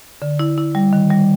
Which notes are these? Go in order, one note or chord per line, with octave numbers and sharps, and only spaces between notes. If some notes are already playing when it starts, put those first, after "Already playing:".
D3
E4
E4
G3
D#3
G3